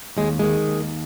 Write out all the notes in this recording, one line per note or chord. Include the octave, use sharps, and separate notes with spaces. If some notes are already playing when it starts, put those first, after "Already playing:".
D#2 G#3
D#3 G#3
D#2